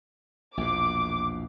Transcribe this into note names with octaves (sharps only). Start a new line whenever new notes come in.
A#1 E2 B2 D6